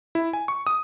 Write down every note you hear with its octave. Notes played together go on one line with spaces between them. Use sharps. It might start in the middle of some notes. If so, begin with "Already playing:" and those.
E4
G#5
C#6
D#6